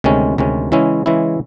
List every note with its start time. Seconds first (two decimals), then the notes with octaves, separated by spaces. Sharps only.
0.04 D2 C3 D#3 G#3 C#4
0.38 D2 C3 D#3 G#3 C#4
0.72 C#3 E3 G#3 C#4 E4
1.06 C#3 E3 G#3 C#4 E4